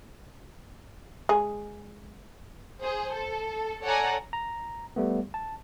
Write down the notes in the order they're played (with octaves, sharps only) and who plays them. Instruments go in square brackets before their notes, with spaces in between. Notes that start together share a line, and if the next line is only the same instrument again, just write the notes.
[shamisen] G#3 G#4
[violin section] G#4 C5
A4
A4 C#5 D5 F#5 G#5 A#5
[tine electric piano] A#5
G3 A3 B3
A5